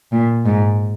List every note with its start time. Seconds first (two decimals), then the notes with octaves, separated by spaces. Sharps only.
0.12 A#2
0.45 G#2